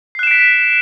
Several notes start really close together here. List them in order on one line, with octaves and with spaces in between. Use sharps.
C7 F#6 E7 D7 B6